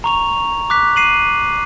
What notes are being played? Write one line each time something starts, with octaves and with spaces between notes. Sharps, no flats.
A#5 C#6 F7
D6 F#6 B6
C7 D#7 F#7